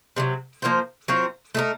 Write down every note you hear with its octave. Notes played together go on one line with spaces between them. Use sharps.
C3 D#3 F#3
F3 A#3 F4 C5
F#3 C4 F4 A#4
A3 D#4 A#4